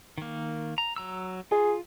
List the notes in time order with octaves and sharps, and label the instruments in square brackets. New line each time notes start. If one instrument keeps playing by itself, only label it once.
[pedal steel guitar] D#3 A#3
A#5
F#3 A#5 E6
[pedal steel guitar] F4 [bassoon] G#4